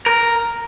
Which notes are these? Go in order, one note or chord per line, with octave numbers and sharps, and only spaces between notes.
A#4